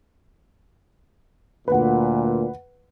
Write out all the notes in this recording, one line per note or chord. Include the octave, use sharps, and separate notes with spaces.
D2 A#2 B4 F#5